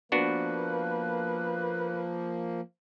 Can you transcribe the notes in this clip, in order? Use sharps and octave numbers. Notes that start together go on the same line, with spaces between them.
F3 A#3 B3 D4 F#4 B4